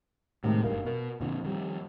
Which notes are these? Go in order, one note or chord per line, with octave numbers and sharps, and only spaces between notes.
A2 C3 D#3 G#3
F#1 G2 A#4 F5
B2 A#4
F2 A#2 D3 F3
D#3 G3